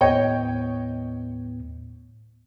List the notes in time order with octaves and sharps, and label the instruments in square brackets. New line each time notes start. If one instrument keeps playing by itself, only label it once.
[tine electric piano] D#2 A2 B3 [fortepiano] C#5 D#5 G5